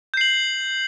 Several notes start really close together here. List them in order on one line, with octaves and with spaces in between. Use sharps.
G6 C7 F#7